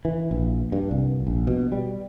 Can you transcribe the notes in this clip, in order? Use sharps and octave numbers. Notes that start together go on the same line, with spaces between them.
E3
A#1
G2
C2
A#1
B2
G3